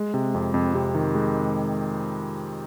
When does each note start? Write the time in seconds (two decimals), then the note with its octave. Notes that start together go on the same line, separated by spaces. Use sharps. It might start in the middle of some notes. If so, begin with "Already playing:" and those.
Already playing: G#3
0.14 C3
0.34 F2
0.54 F2
0.74 C3
0.95 D#3
1.15 G#3